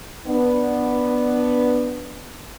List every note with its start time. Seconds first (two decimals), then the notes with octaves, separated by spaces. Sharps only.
0.27 B3 D4